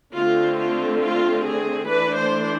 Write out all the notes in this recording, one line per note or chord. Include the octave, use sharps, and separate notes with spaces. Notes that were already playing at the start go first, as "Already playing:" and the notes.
D3 A3 C4 F4
F4
F4
G#4
E3 A3 D4 B4
C5